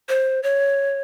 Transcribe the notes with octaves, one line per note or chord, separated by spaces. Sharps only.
C5
C#5